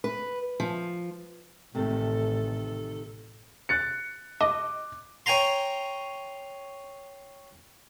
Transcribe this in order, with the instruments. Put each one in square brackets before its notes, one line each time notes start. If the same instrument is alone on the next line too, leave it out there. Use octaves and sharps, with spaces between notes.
[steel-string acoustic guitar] B4
F3
[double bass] A1 [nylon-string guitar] C3 D#3 A3 [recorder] A4
[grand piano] F#6 A6 C#7
[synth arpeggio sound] D#5 [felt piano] D6
[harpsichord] C#5 G5 G#5 A#5 C6